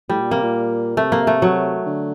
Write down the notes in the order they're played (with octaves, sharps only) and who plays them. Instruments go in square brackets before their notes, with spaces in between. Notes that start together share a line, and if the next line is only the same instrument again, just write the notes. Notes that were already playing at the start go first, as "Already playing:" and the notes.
[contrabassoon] A2 [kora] G3
[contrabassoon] A#2
[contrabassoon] C3 [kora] A#3
[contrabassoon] A#2
[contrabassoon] C3 [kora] A3
[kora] A#3
A3
F#3
[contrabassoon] D3